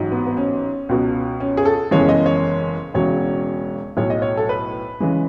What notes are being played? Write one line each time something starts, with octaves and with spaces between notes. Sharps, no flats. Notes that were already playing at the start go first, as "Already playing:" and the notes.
Already playing: A1 G#2 F#3
B3
B3
C#4
C#2 B2 F#3
C#4
G#4
A4
F#1 E2 C#3 E3 G#3 C#5
D#5
C#5
E1 E2 C#3 F#3 C#5
B1 A2 F#3 C#5
D#5
C#5
A4
B4
C#3 E3 G#3